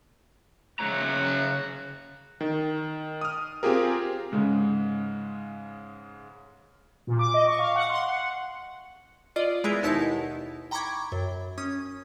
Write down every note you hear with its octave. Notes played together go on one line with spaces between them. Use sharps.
C#3 F#4 C#5 A#5
D#3
D#6 F6
C4 F4 G4 G#4 A#4
G#2 C#3 G#3
A#2
D6
D#5
C#6
F5
F#5
C6
F#5
F4 D5 D#5
G#3 B3 E4 G#4 A#4
D#2 B2 D#4 E4 A5 B6
G5 A#5 B5 C#6 D6 G#6
F#2
C#4 D#6